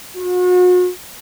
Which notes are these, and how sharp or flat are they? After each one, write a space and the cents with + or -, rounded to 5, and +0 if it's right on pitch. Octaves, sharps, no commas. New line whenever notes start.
F#4 -40